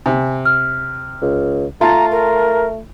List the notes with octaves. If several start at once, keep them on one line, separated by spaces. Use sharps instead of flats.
C3 G#5
F6
C#2
A3 F4 A5 A#5 A6
A#4